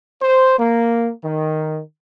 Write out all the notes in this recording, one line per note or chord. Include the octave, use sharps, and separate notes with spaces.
C5
A#3
D#3